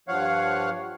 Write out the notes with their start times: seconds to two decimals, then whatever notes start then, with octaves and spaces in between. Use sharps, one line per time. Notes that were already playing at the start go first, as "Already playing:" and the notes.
0.08 G2 F3 C#5 F5 F#5